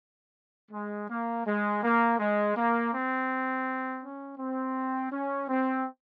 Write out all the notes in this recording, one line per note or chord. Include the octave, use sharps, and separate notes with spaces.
G#3
A#3
G#3
A#3
G#3
A#3
C4
C#4
C4
C#4
C4